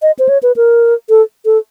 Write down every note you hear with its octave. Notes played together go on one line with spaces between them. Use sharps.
D#5
C5
C#5
B4
A#4
A4
A4